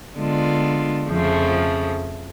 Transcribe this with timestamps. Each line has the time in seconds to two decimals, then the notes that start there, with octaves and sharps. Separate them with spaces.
0.15 D3 G#3 B3 D4 F4
1.09 F2 C#3 F3 A3